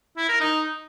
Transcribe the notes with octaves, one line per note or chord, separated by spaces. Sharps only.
E4
A#4
D#4